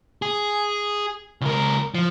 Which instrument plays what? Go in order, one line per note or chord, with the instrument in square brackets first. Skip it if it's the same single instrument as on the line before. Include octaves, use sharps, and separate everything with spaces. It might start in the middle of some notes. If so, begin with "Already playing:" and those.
[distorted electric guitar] G#4
C#2 A#4
F3